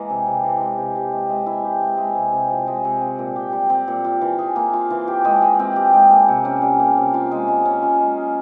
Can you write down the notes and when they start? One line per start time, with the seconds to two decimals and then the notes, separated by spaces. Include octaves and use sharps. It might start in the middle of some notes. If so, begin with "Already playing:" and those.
Already playing: E3 G#3 A#3
0.09 C3
0.27 C3
0.44 E3
0.60 G#3
0.78 C3
0.95 G4
1.12 G#3
1.29 G#3
1.46 E4
1.64 G4
1.81 G#3
1.98 G#3
2.15 C3
2.33 C3
2.49 F3
2.67 G#3
2.84 C3
3.01 C4
3.19 A#2
3.36 G4
3.53 G3
3.70 C4
3.88 A#2
4.04 F4
4.21 E3
4.38 G#4
4.56 A#3
4.73 F4
4.90 E3
5.08 G4
5.25 G#3
5.42 G#3
5.59 C4
5.76 G4
5.94 G#3
6.11 A#3
6.28 C3
6.45 C#4
6.62 G3
6.79 A#3
6.97 C3
7.14 F4
7.31 G#3
7.48 G#3
7.65 C#4
7.82 F4
8.00 G#3
8.17 G#4